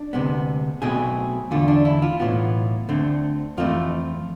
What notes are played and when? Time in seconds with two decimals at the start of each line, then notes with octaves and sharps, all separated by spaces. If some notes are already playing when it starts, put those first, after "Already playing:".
Already playing: D4
0.13 D2 C3 G#3 B3
0.82 B1 B2 A3 C4 G#4
1.51 E2 D3 A3 F4
1.68 D4
1.85 E4
2.02 F4
2.20 B1 A2 E3 B3 F4
2.89 D2 D3 A3 C4
3.57 F2 E3 A3 C4 F4